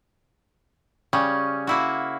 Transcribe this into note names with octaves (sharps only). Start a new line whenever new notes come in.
C#3 G3 C#4
A#3 E4 F#4